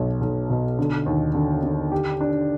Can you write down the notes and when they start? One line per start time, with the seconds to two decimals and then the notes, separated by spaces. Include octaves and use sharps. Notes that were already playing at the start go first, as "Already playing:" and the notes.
Already playing: B1 B2
0.21 B1
0.50 B2
0.78 D3
1.06 D#2
1.34 D3
1.63 D3
1.92 G4
2.21 D4